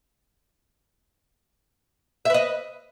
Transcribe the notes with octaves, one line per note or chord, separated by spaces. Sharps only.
B4 D#5 E5